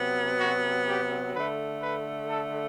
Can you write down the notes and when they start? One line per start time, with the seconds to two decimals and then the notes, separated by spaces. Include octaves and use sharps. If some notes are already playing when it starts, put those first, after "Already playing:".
Already playing: C3 F#3 B3
0.40 F#4
0.88 G4
1.35 D3 A3 B4
1.82 B4
2.30 A4